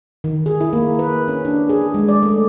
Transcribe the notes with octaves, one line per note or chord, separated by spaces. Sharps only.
D#3
G#4
E4
A#3
B4
C#4
D4
G#4
G#3
D5
A3